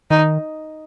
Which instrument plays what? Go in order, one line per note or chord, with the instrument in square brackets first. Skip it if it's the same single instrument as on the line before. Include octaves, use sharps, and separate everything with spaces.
[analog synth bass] D#3 [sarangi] D#4